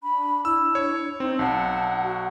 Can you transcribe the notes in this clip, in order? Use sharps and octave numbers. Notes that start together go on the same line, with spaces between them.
D4 B5
E4 E6
C#5
C4 D#4
B1 F#5 A5
F#4